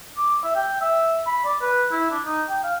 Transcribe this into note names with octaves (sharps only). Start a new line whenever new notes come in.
D6
E5
G5
E5
B5
D5
B4
E4
D4
D#4
G5
F5